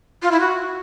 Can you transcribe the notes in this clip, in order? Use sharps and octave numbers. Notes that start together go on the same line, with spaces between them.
F4
E4
F#4